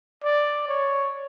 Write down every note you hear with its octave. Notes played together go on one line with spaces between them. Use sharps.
D5
C#5